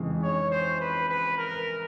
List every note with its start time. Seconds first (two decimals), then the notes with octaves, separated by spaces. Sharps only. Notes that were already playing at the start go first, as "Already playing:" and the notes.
Already playing: F2 C#3 E3 G#3
0.23 C#5
0.51 C5
0.80 B4
1.09 B4
1.38 A#4